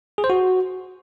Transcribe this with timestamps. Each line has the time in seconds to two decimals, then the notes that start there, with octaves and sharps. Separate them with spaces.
0.18 G#4
0.24 C5
0.30 F#4